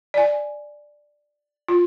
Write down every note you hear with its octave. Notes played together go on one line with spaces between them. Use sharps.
D5 G#5
F4